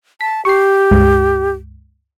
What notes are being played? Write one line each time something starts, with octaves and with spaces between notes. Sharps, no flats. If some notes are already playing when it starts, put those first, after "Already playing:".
A5 B6
G4 C#6 C7
C#2 G2 G#3